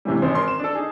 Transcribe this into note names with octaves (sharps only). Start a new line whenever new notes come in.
A2 C3 E3 G3
G#1 C#3 C4 C5
A#4 C6
E7
D4 A4
D#4 G#4